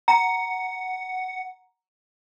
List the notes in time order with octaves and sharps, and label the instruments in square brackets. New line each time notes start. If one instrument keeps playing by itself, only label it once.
[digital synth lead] F#5 [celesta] A#5